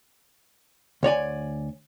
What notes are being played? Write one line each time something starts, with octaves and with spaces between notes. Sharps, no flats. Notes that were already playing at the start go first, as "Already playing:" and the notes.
D2 C#5 D5 G#5